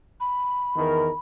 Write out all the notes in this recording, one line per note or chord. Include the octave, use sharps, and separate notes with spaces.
B5
E2 D#3 A#4